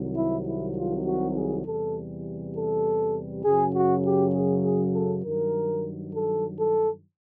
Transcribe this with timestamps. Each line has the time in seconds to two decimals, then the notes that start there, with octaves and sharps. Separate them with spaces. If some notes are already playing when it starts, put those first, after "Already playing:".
Already playing: C2 C3 D#3 F#3
0.17 E4
0.46 E4
0.76 F4
1.06 F#4
1.36 G#4
1.65 E2 C3 E3 G3 A4
2.56 A4
3.45 F#2 C#3 F#3 G#4
3.75 F#4
4.05 G4
4.34 G#4
4.64 G#4
4.93 A4
5.24 G2 D#3 F#3 A#4
6.13 A4
6.59 A4